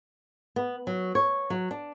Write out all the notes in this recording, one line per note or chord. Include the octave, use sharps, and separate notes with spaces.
B3
F#3
C#5
F#3
D4